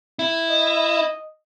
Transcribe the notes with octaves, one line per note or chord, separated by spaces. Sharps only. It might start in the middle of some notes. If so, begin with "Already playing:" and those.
E4
D#5